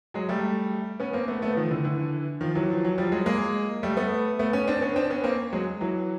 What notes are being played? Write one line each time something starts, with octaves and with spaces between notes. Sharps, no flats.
F#3 G#3
G3 A3
B3 C#4
A#3 C4
A3 B3
A3 B3
D#3 F3
D3 E3
D3 E3
D#3 F3
E3 F#3
F3
F#3
F3 G3
F#3 G#3
G#3 A#3
G3 A3
A3 B3
A3 B3
B3 C#4
C4 D4
B3 C#4
C4 D4
B3 C#4
A#3 C4
F#3 G#3
E3 F#3